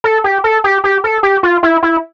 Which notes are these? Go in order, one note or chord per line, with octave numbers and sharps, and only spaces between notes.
A4
G4
A4
G4
G4
A4
G4
F4
E4
E4